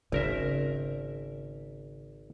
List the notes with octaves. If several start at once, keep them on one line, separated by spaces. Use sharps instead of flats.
G#1 C#3 A#4 E5